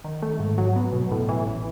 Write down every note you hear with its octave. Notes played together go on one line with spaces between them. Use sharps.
D#3
A3
G#2
F#3
B3
B2
A2
E3
A1